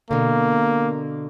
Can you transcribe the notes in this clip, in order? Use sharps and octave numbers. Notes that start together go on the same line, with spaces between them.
B2 D3 A#3